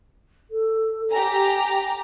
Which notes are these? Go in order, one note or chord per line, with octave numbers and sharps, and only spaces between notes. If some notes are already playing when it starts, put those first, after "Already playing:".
A4
G4 G#5 A#5